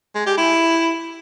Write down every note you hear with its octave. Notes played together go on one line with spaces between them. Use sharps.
G#3
G4
E4